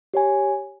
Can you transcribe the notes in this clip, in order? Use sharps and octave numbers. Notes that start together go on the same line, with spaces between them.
G4 C#5 G#5